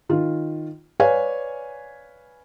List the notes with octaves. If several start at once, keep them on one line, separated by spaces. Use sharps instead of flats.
D#3 F4
B4 C#5 D5 F5 G#5